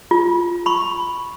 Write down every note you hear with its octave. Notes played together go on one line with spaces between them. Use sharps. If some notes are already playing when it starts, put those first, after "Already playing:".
F4
B5 C#6